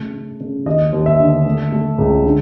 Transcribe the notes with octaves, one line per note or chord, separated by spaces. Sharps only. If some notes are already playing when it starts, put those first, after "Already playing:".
Already playing: C#3 A3
C#3
C#3
D#2 D#5
D#2
E5
D3
A3
A3
C#2
D3